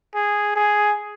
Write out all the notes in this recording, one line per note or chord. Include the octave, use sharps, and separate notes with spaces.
G#4
G#4